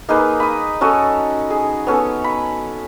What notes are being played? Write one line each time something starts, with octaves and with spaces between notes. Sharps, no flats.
A#3 D#4 G#4 B4
B5 D#6
C#4 F#4 A4 D#6
G#4
B3 C#4 A4
B5